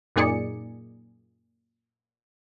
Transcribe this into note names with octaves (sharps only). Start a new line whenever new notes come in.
F#2 A#2 D#4 G#4 D5 C#7